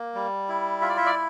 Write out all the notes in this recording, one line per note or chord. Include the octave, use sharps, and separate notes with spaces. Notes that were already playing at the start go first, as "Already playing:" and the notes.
Already playing: A#3
G3
E4
F4 E5
D5
E5
D5